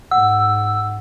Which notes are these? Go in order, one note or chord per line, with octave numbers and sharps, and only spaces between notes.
G#2 F#5 E6